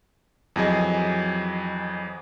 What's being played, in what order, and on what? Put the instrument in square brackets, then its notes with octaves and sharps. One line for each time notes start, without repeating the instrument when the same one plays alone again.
[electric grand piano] F2 E3 F#3 G#4 D#5